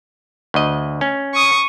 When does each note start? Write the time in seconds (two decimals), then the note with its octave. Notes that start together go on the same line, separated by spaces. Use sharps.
0.54 D2 D#5
1.01 C#4
1.34 C#6 D#6